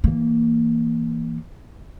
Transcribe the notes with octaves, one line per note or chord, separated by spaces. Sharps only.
E3 A#3